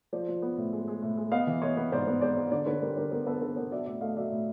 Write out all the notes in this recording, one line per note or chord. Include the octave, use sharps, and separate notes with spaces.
F3 C5 D5
F3
B3
A2
G#3
G#3
A2
G#3
B3 D#5 F5
E3
B3 C#5 D#5
B3
G#2 C5 D5
B3
G#3 C5 D5
G#3
D3 C5 D5
D3 B4 C#5
G3 A#4 C5
D3 A#4 C5
B3 A#4 C5
B3 A4 B4
D3 A4 B4
B3 A#4 C5
F#3 D5 E5
A2 D5 E5
A3 D#5 F5
F#3 D5 E5
A2